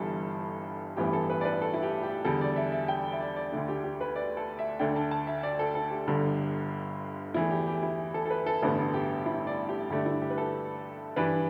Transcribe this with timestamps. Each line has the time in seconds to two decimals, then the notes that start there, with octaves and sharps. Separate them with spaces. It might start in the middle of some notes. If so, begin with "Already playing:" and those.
Already playing: G1 G2 E3 G3 A4
0.97 A1 G2 E3 B3 G4
1.13 A4
1.30 B4
1.41 D5
1.45 B4
1.61 A4
1.74 E4
1.83 G4
2.03 G4
2.25 E2 D3 G3 A4
2.41 D5
2.56 E5
2.72 E5
2.88 G5
3.12 E5
3.20 D5
3.36 D5
3.52 D2 D3 A3 D4
3.68 G4
3.84 G4
4.01 B4
4.16 D5
4.37 A4
4.59 E5
4.79 D2 D3 A3 D4 G5
4.96 A5
5.11 A5
5.27 E5
5.43 D5
5.59 A4
5.75 A4
5.91 G4
6.07 G1 G2 D3
7.34 E2 E3 A3 E4
7.51 G4
7.67 G4
7.83 E4
8.14 A4
8.25 A4
8.30 B4
8.46 A4
8.62 A1 G2 D3 G3 B3 A4
8.94 G4
9.26 E4
9.47 D5
9.69 G4
9.90 G2 D3 A3 D4 G4
10.06 E4
10.22 G4
10.30 B4
10.38 A4
11.16 G2 E3 G3 D4 B4